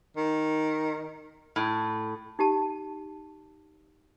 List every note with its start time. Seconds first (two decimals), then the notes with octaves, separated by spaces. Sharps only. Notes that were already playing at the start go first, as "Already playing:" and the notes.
0.17 D#3
1.56 A2
2.39 D#4 G4 A5